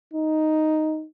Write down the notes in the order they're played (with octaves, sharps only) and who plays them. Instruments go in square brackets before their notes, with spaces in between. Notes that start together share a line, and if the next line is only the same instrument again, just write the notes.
[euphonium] D#4